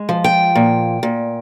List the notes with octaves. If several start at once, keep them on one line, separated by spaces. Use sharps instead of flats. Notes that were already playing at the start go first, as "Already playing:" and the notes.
Already playing: G#3
F3
G5
A#2
A#2